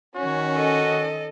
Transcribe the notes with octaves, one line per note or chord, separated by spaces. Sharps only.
D#3 C#4 F#4
A4 D#5